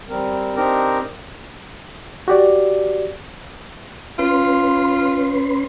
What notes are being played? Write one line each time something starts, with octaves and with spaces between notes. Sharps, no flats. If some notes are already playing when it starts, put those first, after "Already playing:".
G3 C4 A#4
C4 D4 D#4 G4 A#4
F#4 G4 D5
C#4 F4 B4 C6